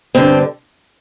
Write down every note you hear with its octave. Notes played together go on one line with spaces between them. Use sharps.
G2 D3 C4